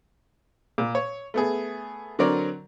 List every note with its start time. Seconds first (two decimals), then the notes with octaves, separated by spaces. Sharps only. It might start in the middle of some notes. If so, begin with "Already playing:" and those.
0.78 A#2
0.95 C#5
1.34 A3 B3 G#4
2.19 D3 F#3 C4 A#4 C#5 D5